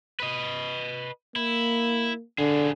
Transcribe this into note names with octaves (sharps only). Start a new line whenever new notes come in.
B4 D#5
A#3 E4
D3 D4 G#4